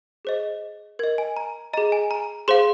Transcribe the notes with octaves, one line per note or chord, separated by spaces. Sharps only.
G#4 C5 D#5
A#4 D#5 G#6
G#5
A#5
G#4 D#5 A#5
G#5
A#5
G#4 C5 F5 C6